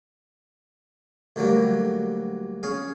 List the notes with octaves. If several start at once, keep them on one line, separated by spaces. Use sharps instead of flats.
D2 D3 F#3 G3 A#3
C#4 G#4 F5